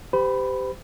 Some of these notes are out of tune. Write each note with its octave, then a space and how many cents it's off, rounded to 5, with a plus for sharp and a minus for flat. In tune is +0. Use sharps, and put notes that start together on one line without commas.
G4 +0 C5 -40 B5 +0